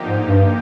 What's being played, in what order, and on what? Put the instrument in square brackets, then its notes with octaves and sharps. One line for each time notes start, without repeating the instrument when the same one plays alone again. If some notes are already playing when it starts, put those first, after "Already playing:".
Already playing: [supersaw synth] D3 F3 A#3 D#4 G4
[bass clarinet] G#2
G2